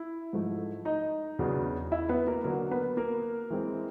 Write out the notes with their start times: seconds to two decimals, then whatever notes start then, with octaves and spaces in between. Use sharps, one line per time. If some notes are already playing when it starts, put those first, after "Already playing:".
Already playing: E4
0.33 G#2 F3 A3
0.85 D#4 D#5
1.39 E2 C#3 F#3 B3 D4
1.92 E4 E5
2.09 B3 B4
2.27 A#3 A#4
2.44 D3 F#3 A#3 D4 A#4
2.71 B3 B4
2.97 A#3 A#4
3.50 E3 G#3 C4